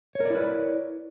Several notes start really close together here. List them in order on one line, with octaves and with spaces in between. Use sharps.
C#5 A#4 D5 E4 B4